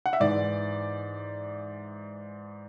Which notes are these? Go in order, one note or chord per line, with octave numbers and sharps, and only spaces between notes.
F#5
E5
G#2 E3 D5